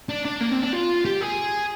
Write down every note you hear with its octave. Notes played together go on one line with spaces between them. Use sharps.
D4
D4
A#3
C4
D4
F4
G4
G#4